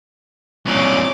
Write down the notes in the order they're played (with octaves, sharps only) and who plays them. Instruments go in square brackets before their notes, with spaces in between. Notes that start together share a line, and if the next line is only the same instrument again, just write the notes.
[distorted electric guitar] C2 A#2 [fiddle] C#4 D6